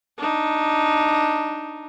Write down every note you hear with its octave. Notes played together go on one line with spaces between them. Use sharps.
D4 D#4